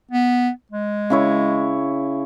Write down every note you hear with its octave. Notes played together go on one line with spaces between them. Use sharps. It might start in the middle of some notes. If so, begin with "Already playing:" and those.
B3
G#3
C#3 E4 C#5